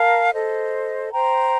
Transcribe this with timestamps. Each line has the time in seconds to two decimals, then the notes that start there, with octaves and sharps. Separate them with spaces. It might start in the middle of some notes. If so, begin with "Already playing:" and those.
Already playing: A#4 F5 A5
0.32 A4 C5 D#5
1.11 C5 G5 A#5